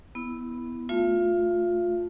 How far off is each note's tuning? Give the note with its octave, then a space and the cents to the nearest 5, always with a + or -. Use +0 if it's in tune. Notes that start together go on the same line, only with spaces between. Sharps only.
B3 +0 E4 +0
A3 +0 F4 +20 F5 -45